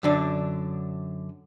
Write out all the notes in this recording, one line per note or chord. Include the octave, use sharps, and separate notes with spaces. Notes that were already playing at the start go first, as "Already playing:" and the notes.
F#2 D3 D4